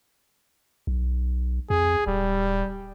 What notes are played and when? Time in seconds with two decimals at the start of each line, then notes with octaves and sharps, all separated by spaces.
0.87 B1
1.70 F2 G#4
2.07 D1 G3